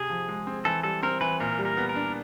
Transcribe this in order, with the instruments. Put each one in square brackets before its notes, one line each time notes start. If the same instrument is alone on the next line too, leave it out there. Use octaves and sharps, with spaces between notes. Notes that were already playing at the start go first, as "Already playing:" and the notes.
Already playing: [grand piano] C3 [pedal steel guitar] G#4
[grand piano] F3
G#3
C4
[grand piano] E3 [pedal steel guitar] A4
[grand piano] G3 [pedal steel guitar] A4
[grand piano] C4 [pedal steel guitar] A#4
[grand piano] E3 [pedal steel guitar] B4
[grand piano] A#2 [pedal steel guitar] A#4
[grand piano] G3
[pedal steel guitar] A#4
[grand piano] B3
[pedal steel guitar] A#4
[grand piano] D4